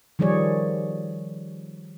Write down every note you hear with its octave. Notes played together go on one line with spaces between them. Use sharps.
D#3 F3 G3 G#4 C#5 D5